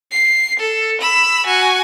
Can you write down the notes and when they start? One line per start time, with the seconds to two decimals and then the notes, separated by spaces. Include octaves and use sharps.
0.12 C7
0.60 A4
1.01 B5 E6
1.46 F#4 G#5